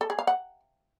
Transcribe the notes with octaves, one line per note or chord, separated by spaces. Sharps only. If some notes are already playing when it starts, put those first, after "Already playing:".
A4
G#4
F5
F#5